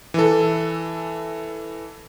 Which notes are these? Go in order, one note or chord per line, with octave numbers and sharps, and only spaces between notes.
E3 A4